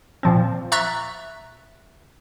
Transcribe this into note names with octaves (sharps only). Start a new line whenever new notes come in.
A#2 F3 C4
E5 A#5 C#6 F#6 A6